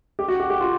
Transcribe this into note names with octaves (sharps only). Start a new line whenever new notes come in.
G4
F#4
G4
G4
F4